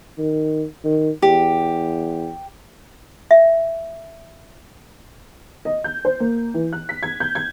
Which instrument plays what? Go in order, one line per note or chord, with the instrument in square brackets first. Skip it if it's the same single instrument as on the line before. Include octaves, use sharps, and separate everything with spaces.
[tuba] D#3
D#3
[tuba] E2 [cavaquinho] G4
[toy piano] E5
[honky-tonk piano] D#5
G6
C5
A#3
E3
F#6
B6
G#6
G6
G#6